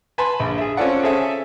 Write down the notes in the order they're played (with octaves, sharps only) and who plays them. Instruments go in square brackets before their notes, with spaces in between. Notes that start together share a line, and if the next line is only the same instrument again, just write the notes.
[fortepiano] B4 G#5 A5 B5 C6
A#1
G#4 E5
C4 C#4 F4 A4 D5 F#5
C4 C#4 G#4 A4 E5 G#5